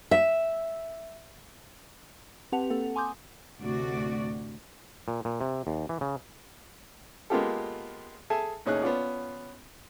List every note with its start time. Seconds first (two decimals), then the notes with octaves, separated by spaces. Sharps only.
0.11 E5
2.52 C4 G4 B4 F#5 A5 F7
2.70 A#3 C4 A4 F#5
2.96 G#5 C6 D6 D#6 G6
3.61 D2 A2 C3 F#4 D5
5.08 A#2
5.25 A#2
5.41 C3
5.67 D#2
5.89 E3
6.01 C#3
7.30 G#3 A#3 B3 F4 G4 A4
8.30 G#4 A4 E5 G#5 A5
8.66 A1 D#2 C#4 D#4 G#4 F#6
8.82 B3 C#4 F4 D5